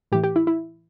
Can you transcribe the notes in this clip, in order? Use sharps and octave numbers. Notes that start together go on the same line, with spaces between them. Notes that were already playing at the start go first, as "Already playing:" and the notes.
A2 E3 G4
G4
E4
E4